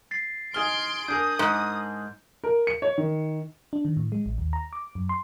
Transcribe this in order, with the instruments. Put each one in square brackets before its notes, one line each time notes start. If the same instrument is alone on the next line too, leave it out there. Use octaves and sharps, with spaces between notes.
[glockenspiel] A6 C7
[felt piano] D#4 G#4 F6 [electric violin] C6 D7 [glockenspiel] G#6 G7
[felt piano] D4 G#4 A#4 [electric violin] D#6 [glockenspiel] G6
[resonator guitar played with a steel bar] G#2
[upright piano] A#4
C#7
C#5
D#3
[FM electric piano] D4
D#3
A2
G#3
A1
D#2
A#5
D6
F#2
C6